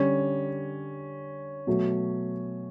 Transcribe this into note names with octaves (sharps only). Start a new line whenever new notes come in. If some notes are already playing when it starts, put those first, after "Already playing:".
Already playing: D3 G3 C#4
B2 F#3 A3